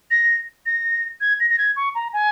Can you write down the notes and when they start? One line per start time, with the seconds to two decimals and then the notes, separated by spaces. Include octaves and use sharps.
0.11 A#6
0.66 A#6
1.21 G#6
1.40 A#6
1.50 A#6
1.58 G#6
1.76 C#6
1.95 A#5
2.13 G#5